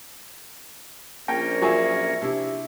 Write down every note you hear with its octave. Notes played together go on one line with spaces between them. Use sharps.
A#1 A#3 C#4 G5
F#3 F4 G#4 E5 C#6
C3 D4 E4